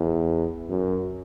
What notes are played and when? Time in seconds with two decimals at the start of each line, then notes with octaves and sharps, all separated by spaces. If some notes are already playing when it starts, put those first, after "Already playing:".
Already playing: E2
0.70 F#2